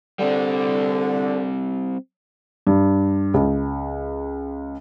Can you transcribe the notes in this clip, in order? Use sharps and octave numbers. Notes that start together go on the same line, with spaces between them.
D3 G3 C4
G2
C#2